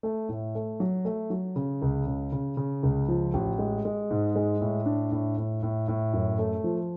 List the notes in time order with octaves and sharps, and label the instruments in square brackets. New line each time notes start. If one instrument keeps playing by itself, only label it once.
[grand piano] A3
A2
A3
F#3
A3
F#3
C#3
C#2
C#3
C#3
C#3
C#2
F3
A1
G#3
G#3
G#2
G#3
A2
D4
A2
A2
A2
A2
F#2
A3
F3